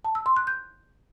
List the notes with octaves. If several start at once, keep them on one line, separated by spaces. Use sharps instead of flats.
A5
E6
C6
F#6
G6